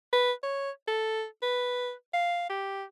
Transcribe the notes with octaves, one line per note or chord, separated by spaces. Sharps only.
B4
C#5
A4
B4
F5
G4